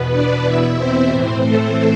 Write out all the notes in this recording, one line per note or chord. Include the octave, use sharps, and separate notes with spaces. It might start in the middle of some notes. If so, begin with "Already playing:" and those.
Already playing: E2 B2 B3 B4
D4 D5
E2 B2 E4 E5
C4 C5
A2 E3
A3 A4